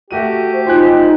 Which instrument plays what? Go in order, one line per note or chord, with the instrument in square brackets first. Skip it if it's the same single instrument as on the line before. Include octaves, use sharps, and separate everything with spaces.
[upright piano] A3 F#4 D#7 [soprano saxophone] G4
[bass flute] C5
[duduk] D#4 [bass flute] F4 [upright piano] C5 G#5 F#6